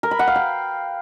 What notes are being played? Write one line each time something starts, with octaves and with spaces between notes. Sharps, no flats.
A#4
B5
F#5
F5
G5